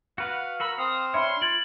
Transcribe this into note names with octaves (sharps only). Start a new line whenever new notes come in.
F#4 B4 F5 F#5 F#6
F#4 A#4 B5 E6
C4 F5 D#6
D4 C#5 E5 B5 C6 F6
F4 G#6 A6 D7 F#7